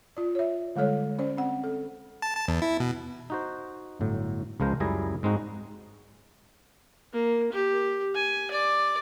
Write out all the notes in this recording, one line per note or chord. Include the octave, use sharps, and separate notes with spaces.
F4 D5
C#5 E5
D3 G3 G#3 A4 C#5
C#4 C5 D5
C4 F#5
A4
A5
A5
E2
E4
B2
D#4 F#4 C5
G1 A2 F#3
C#2 F3 G#3 A#4 C5
C#2 F#2 G3 E4 G#4 A#5
G#2 G#3 C4 D#4 F#4
A#3
G4
G#5
D5